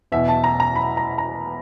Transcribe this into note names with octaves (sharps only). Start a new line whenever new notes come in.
E2 B2 E5
A5
A#5
A#5
B5
A#5
A#5